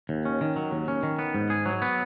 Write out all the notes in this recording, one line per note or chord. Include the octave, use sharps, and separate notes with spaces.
D#2
C#4
D#3
F#3
D#2
C#4
D#3
B3
G#2
G#4
F#3
B3